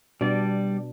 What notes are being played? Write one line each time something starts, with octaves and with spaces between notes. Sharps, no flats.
B2 G3 D4 D5